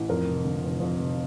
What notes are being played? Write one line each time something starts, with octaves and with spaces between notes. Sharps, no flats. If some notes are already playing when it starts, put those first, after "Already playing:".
Already playing: A1
F2 A#4
F1
D3
F1
F2
F1